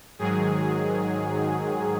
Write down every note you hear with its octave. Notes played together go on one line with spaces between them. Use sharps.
G#2 D#3 F#3 G#4